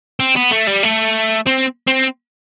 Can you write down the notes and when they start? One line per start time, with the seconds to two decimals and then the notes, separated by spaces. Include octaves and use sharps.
0.20 C4
0.36 B3
0.51 A3
0.67 G3
0.83 A3
1.47 C4
1.88 C4